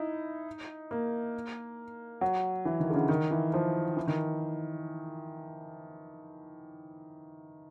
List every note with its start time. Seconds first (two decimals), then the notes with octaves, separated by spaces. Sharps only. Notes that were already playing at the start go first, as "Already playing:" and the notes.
Already playing: D#4 E4
0.91 A#3
2.21 F#3
2.65 E3
2.80 D#3
2.90 D3
2.95 C#3
3.09 D#3
3.31 E3
3.54 F3
3.97 E3
4.07 D#3